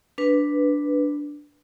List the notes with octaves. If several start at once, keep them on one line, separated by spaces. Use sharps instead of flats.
D4 B4